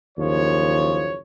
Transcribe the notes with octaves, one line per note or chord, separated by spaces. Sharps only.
F#1 D#2 F3 C#5